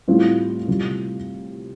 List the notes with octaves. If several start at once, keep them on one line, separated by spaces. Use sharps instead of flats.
A2 G3 C4 F4
C3 G3 C4 F4